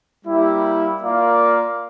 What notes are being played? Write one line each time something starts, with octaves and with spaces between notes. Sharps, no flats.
G3 A#3 E4 G4
A#3 F4 A#4 D5 F5